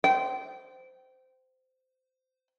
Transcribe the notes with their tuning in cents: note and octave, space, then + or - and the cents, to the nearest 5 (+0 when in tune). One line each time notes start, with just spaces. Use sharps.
C5 -15 G5 -25